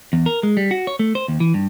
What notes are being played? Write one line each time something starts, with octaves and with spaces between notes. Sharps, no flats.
E2
A#4
G#3
G3
F#4
C#5
A3
C5
D#2
E3
G2